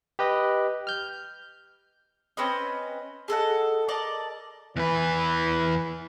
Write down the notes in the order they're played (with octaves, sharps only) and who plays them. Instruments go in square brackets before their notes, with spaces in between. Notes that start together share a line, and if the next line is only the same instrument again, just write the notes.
[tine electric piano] G4 B4 D#5
F6 G6
[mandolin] C4 C#4 B4 D#5
G#4 A4 D#5 F#5
A#4 D5 D#5 A5
[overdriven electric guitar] E2 B4 [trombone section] E3